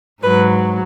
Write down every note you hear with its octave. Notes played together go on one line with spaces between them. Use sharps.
G#2 F#3 B4